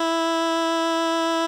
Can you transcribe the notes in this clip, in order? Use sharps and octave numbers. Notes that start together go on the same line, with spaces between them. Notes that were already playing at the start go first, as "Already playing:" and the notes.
Already playing: E4